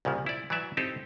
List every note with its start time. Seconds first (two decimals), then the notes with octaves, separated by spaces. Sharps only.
0.05 C2 A#2 C#3 F3
0.26 E4 D5
0.50 E3 F#3 D5 E5
0.77 C4 D#4 E4 G4 A4